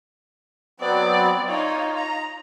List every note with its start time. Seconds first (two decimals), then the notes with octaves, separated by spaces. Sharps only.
0.80 F#3 B3 C4 D5
1.48 D#4 F4 C#5
1.96 A#5